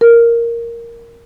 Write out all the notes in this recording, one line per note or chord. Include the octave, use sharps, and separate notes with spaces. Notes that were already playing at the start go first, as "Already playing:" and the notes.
A#4